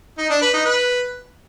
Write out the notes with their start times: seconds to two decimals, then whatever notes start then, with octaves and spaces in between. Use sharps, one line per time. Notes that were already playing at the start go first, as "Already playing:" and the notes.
0.18 D#4
0.30 D4
0.42 B4
0.53 D#4
0.65 B4